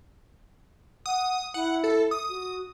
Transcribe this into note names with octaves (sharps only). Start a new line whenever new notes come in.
F#5 D#6
E4 F#5
A4
D#6
F#4